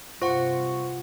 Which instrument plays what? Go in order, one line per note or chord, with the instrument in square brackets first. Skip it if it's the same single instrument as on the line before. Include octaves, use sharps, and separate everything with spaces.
[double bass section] G2 C3 [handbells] F4 F#5 [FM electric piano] C5 C#6